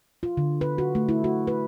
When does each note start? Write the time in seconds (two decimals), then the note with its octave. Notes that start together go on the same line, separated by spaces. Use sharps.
0.23 F4
0.37 D3
0.61 B4
0.78 F#4
0.95 A3
1.09 E4
1.24 F#4
1.47 B4